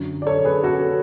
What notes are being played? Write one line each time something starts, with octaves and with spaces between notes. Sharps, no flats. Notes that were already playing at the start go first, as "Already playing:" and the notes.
Already playing: F#2 D3 F#3
D5
A4 C#5
G#4 B4
F#4 A4